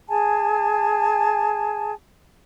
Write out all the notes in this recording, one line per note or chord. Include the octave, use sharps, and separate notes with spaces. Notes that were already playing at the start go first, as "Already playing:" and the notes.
G#4 G#5 A5